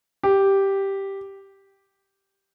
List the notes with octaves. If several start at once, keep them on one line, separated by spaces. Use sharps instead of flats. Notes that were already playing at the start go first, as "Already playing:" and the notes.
G4